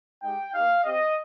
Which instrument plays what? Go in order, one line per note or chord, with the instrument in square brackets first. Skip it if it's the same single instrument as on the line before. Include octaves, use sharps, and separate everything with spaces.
[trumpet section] G#3 D#4 G4 G5
A#3 D#4 G4 F5
C4 G4 D#5